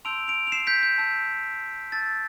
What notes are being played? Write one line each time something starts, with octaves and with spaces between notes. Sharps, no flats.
A5 C6 E6 G6 D7 F7
D7 F7
F7
C7 E7
G6 B6
G6
A5 E6 G6
A5 E6 G6 A6